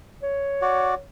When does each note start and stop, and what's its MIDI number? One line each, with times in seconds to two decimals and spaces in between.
0.23 1.03 73
0.62 0.95 66
0.62 0.95 74